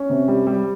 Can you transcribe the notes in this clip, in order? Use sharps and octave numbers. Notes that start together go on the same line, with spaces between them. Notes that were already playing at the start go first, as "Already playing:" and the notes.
Already playing: C#4
C3
G3
G3